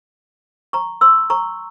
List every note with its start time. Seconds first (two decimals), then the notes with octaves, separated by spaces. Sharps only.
0.73 A#5 C#6
1.01 C6 E6
1.30 A#5 C#6